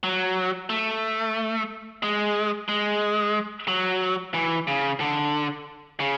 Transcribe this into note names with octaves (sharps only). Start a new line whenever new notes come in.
F#3
A3
G#3
G#3
F#3
E3
C#3
D3
C#3